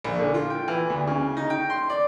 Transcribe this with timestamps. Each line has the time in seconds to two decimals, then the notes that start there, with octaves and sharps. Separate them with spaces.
0.04 A#1
0.19 D3
0.34 F4
0.50 G5
0.68 E3
0.90 D2
1.07 C#3
1.37 D#4
1.50 G5
1.70 C6
1.90 D5